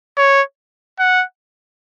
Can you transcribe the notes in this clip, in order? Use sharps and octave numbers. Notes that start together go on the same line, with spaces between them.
C#5
F#5